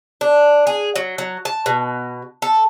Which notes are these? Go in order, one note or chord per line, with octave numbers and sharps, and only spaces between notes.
D4
G#4
F#3
F#3
A5
B2
A4